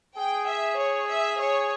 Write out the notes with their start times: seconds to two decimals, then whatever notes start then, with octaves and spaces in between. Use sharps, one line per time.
0.17 G#4 G5
0.48 E5
0.78 C#5
1.09 E5
1.39 C#5